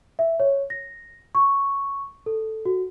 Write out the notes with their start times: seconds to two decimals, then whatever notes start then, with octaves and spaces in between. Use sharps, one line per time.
0.19 E5
0.40 C#5
0.70 A#6
1.35 C#6
2.26 A4
2.65 F#4